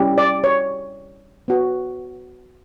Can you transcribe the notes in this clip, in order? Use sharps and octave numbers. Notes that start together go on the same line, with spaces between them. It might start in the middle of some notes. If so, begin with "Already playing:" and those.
Already playing: G3 C#4 E4 G4
D5
C#5
B3 F#4